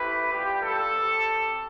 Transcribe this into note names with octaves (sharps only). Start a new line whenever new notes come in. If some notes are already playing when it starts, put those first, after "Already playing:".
Already playing: A3 C4 E4 G4 B4
G3 B3 F4 G4
A4
G3 C4 G4